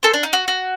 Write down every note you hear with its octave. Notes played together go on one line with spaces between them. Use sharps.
A4 C5
D4
D#4
F#4
F#4